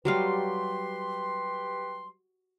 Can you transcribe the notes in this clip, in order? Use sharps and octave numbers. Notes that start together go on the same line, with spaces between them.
F#3 G3 G4 B4 F5 C6